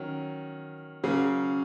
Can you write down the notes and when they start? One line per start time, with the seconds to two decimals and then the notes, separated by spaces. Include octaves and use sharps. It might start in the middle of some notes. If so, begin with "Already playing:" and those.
Already playing: D#3 F#3 C#4
1.03 C#3 F#3 A#3